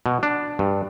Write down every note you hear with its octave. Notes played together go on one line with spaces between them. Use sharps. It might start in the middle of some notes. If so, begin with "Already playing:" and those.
B2
D4
G2